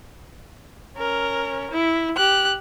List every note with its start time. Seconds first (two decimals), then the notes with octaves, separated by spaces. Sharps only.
0.97 C#4 A#4
1.71 E4
2.17 G4 F#6